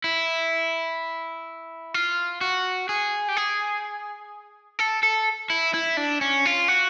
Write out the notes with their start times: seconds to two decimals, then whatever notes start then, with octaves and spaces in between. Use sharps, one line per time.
0.04 E4
1.94 F4
2.41 F#4
2.89 G#4
3.28 G4
3.37 G#4
4.79 A4
5.03 A4
5.50 E4
5.74 E4
5.97 D4
6.21 C#4
6.46 F4
6.68 F#4